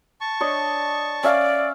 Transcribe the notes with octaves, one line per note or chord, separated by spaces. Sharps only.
A5 C#6
D4 C#5 D#5
C#4 D5 E5 F5